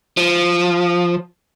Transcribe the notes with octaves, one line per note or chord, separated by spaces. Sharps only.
F3